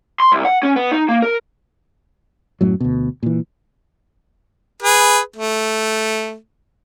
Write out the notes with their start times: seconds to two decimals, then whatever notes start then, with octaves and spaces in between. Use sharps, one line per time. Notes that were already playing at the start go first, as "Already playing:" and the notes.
0.20 C6
0.32 C2
0.45 F#5
0.63 C#4
0.76 B3
0.92 D#4
1.09 A#3
1.22 A#4
2.61 F#2 A2 F#3
2.80 D2 B2
3.23 A#2 E3
4.82 G#4 B4
5.36 A3